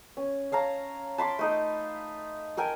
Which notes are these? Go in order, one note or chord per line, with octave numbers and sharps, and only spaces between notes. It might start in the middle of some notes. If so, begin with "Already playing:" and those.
C#4
C#4 F5 A5 A#5
A5 B5 C6 D6
A3 D#4 A4
A4 A#4 G5 G#5